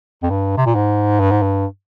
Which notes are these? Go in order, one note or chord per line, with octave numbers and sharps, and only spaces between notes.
F2
G2
C3
A#2
G#2
G2
G#2
G2